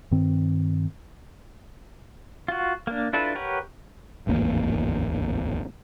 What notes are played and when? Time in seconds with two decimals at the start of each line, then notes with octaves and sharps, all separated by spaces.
0.11 G2 D#3 C4
2.48 F4 F#4
2.87 A#3 D4
3.13 D4 E4 F4 A4 B4
3.35 G4 A#4 B4 C#5 F#5
4.27 D1 G#1 E2 A#3